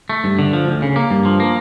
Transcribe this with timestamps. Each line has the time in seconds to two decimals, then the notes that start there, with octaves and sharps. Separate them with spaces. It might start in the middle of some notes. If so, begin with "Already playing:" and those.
0.10 A3
0.24 G2
0.39 D3
0.53 F3
0.67 D2
0.82 C#3
0.96 A#3
1.10 G2
1.25 F3
1.40 A#3